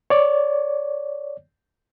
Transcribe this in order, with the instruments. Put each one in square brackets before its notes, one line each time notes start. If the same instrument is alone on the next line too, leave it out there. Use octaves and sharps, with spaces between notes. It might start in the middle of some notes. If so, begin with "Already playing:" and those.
[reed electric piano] C#5 D5